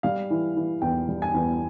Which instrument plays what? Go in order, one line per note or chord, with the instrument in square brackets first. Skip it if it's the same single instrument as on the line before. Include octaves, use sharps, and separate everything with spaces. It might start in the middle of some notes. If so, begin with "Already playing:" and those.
[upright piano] G3 F5
E3
E3
E2 G5
G3
G#5
E2